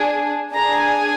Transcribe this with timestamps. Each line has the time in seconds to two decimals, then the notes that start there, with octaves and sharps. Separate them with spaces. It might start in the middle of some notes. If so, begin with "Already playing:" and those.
Already playing: D4 G#4
0.53 D4 G#4 A#5
0.81 G#5